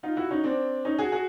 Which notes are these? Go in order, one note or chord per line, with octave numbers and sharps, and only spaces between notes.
D#4 F4
E4 F#4
C#4 D#4
C4 D4
C#4 D#4
F#4 G#4
F#4 G#4